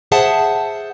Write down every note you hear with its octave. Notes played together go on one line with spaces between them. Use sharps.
G#4 C5 E5 F#5 A5